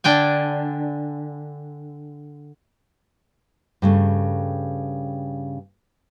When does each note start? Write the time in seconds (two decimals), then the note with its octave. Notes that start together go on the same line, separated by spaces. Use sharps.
0.04 D3 D4 G5 G#5
3.82 G2 C#3 A3